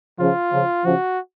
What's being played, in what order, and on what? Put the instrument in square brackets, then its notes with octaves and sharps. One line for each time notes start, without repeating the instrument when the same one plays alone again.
[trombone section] C#3 F3 [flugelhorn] F4
[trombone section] C#3 F3
[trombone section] C#3 F3 [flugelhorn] F#4